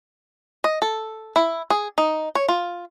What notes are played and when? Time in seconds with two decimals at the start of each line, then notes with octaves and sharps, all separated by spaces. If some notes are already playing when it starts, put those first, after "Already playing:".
0.64 D#5
0.82 A4
1.36 E4
1.70 G#4
1.98 D#4
2.35 C#5
2.49 F4